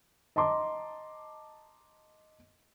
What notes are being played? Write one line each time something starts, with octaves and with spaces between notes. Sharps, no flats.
D#5 A5 A#5 C6 D6